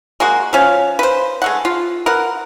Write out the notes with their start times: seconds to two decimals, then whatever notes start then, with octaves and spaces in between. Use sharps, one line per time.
0.20 G#3 A#3 F#4
0.53 F3 C#4 F5
0.99 B4 C5
1.42 G#3 A3 F#5
1.65 F4
2.06 A#4 B4 F#5